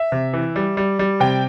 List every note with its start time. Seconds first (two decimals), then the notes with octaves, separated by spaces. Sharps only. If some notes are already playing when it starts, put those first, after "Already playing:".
Already playing: E5
0.12 C3
0.34 E3
0.56 G3
0.77 G3
0.99 G3
1.20 C3 G5